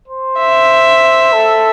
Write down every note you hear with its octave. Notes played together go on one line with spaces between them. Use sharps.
C5
E5
A4